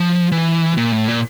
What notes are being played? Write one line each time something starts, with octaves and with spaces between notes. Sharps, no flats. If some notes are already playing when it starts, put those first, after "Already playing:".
Already playing: F3
E3
A#2
A2
A#2